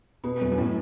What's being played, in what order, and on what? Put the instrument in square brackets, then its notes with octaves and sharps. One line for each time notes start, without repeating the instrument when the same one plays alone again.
[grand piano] B2 [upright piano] B3
[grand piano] F#2 [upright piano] B3
[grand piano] F#2
[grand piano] A2 [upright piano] B3